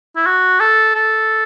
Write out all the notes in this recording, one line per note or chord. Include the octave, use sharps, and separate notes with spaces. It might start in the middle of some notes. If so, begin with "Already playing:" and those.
E4
F#4
A4
A4